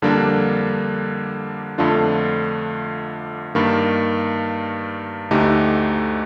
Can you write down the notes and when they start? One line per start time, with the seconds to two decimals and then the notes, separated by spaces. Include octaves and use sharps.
0.02 F2 D3 G3 A#3 D4
1.78 F2 D3 A3 D4 F4
3.55 G2 D#3 A#3
5.31 D2 D3 A3 D#4 G4